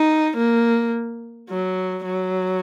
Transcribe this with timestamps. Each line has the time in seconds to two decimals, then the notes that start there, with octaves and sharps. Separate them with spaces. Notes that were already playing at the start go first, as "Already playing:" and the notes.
Already playing: D#4
0.38 A#3
1.49 F#3
2.05 F#3